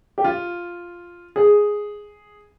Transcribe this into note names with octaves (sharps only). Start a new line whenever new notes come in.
G4
F4
G#4